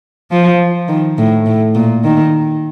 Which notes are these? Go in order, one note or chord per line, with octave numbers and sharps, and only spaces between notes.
F3
D#3
A2
A2
A#2
D#3